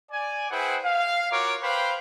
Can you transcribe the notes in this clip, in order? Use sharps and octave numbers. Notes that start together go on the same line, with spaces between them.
D5 G#5
E4 G#4 B4 C5 F#5 G5
F5
F4 F#4 A#4 C#5 D6
B4 C5 F5 G5 B5